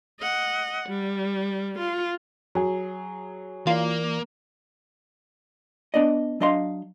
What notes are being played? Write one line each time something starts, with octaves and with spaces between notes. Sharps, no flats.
D#5 F#5
G3
F4
F#3 G#4
E3 A#3 F4 D5
B3 D4 D5 D#5
F#3 D4 D#5 F5 C6